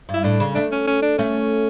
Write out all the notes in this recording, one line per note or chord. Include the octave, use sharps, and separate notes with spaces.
G2
E4
A2 D4
C#3
A3 D4
C#4
C#4
D4
A3 C#4